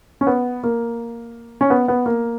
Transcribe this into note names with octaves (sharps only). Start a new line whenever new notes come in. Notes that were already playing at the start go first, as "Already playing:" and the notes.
C#4
B3
A#3
C#4
B3
B3
A#3